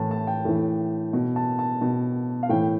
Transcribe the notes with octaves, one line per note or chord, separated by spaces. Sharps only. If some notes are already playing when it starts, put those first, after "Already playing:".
Already playing: A2 E3 A5
A5
G5
A2 E3
B2
A5
A5
B2
F5
A2 E3 G5